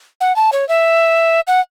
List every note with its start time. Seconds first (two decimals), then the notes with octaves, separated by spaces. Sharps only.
0.21 F#5
0.36 A5
0.52 C#5
0.69 E5
1.47 F#5